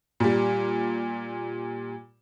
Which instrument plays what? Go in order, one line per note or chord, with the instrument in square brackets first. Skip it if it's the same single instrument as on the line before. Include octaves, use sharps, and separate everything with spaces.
[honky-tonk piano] A#2 G3